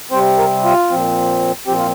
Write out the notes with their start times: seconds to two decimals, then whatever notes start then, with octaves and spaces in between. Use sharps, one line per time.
0.11 C3 G3 C4 C5
0.38 A#4
0.64 F4
0.90 A#2 F3 C4
1.67 A#2 F3 C4 G4
1.77 F4